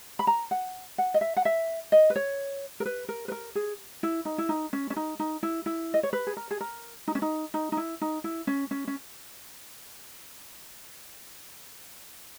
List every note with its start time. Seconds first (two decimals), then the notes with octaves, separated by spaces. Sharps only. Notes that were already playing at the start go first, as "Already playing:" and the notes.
0.19 B5
0.27 A#5
0.51 F#5
0.98 F#5
1.14 D#5
1.21 E5
1.36 F#5
1.45 E5
1.92 D#5
2.10 B4
2.16 C#5
2.80 A#4
2.86 B4
3.09 A#4
3.28 B4
3.32 A#4
3.55 G#4
4.03 E4
4.25 D#4
4.38 E4
4.49 D#4
4.73 C#4
4.90 C#4
4.96 D#4
5.19 D#4
5.43 E4
5.66 E4
5.94 D#5
6.03 C#5
6.13 B4
6.27 G#4
6.37 A#4
6.51 G#4
6.61 A#4
7.08 D#4
7.15 C#4
7.22 D#4
7.54 D#4
7.72 D#4
7.77 E4
8.01 D#4
8.24 E4
8.47 C#4
8.71 C#4
8.87 C#4